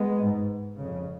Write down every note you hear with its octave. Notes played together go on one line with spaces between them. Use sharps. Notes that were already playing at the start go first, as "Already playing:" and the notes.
Already playing: G#3 B3
G#2
F2 C#3